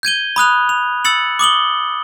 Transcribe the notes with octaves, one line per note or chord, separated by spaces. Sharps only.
G6 G#6 D#7 G7
B5 D#6 F#6 F7
F7
E6 A6 C#7 F#7
D6 D#6 F#7 G7